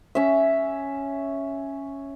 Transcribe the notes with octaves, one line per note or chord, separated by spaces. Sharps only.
C#4 E5